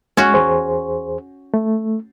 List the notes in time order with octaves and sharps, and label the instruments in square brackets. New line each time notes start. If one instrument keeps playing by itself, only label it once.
[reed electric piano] G#3 [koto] C#4 F#4
[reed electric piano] E2 G#4 C5
A3